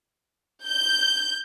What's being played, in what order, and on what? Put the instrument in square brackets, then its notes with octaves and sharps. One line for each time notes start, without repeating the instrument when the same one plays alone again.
[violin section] G6